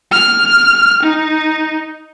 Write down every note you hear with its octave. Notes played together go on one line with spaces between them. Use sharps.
F6
D#4